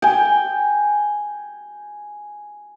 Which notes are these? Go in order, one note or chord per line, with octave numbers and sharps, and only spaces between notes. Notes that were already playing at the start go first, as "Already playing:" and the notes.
G5 G#5